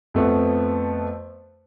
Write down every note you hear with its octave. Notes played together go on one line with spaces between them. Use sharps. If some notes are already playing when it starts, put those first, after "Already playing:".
F2 A3 B3